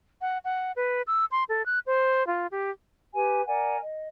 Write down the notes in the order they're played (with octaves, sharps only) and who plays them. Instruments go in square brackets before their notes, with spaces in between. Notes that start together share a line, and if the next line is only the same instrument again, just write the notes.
[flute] F#5
F#5
B4
E6
C6
A4
F#6
C5
F4
G4
[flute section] G4 B4 G#5
A#4 D5 F#5 G#5
D#5